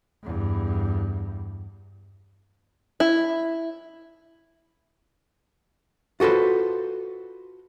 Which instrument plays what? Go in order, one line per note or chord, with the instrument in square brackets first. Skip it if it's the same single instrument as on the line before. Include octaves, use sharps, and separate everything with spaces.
[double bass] E2 G2
[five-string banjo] E4
[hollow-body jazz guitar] F4 F#4 A4 B4 C5